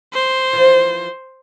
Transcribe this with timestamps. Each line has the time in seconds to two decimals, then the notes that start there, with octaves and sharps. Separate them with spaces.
0.13 C5
0.53 E3 F3